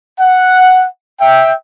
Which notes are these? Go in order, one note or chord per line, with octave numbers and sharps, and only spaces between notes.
F#5
E5 G5